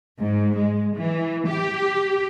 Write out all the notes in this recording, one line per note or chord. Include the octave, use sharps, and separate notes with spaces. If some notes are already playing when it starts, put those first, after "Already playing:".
G#2
G#3
E3
G4